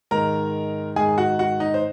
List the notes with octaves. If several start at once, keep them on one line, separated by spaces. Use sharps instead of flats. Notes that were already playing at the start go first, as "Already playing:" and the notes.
G#2 D#3 G#3 A#4 A#5
G#2 D#3 G#3 G#4 G#5
F#4 F#5
F#4 F#5
D#4 D#5
C5